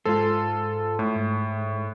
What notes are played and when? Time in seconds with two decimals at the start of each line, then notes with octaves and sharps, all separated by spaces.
0.05 G#2 G#3 F4 A4 C5
0.99 A2
1.15 G#2